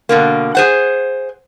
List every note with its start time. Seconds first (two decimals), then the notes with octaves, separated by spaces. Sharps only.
0.09 B2 D3 A#3
0.55 G#4 C5 F#5